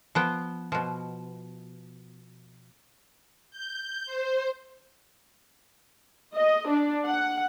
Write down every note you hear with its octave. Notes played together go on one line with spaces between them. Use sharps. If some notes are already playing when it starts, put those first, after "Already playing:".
F3 B3 G5
B2 F3
G6
C5
D#5
D4
F#5